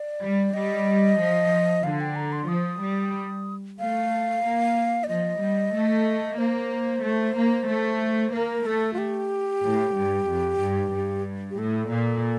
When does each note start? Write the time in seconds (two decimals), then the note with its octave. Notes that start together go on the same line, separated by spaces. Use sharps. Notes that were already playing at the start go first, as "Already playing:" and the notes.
Already playing: D5
0.21 G3
0.54 G3 D#5
1.19 F3
1.83 D3 F5
2.00 G5
2.16 A#5
2.32 C6
2.48 F3 D#6
2.81 G3
3.79 A3 F5
4.44 A#3
5.04 D5
5.08 F3 D#5
5.41 G3
5.74 A3
6.38 A#3 C5
7.04 A3
7.37 A#3
7.68 A3
8.33 A#3 A#4
8.65 A3 A4
8.93 F4
8.98 G4
9.63 A2
9.96 G2
10.28 F2
10.61 G2
10.94 G2
11.50 G4
11.59 A2 A4
11.90 A#2